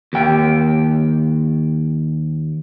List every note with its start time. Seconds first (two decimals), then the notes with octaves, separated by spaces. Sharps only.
0.13 D#2 G5